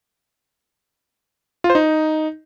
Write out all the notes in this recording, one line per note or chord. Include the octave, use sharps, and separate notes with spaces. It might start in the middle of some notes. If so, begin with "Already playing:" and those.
F4
C5
D#4